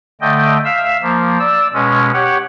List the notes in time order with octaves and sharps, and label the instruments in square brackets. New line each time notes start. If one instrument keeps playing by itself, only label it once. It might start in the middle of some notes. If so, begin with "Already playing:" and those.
[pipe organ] D3 A3 D#5 G5
E5 F5 E6
F3 A#3
D5 E6
B2 G#3 C#4
G4 C#5 F#5